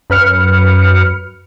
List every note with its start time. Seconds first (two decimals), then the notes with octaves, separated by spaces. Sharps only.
0.10 F#2 B4 F6 C#7